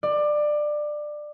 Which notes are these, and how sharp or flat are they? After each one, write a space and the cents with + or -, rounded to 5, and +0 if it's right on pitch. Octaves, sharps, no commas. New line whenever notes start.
D5 +20